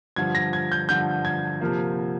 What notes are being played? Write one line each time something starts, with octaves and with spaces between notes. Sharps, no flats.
G2 D3 F3 G#6
A#6
G#6
G6
G2 D3 F3 G6
G#6
C3 F3 A#3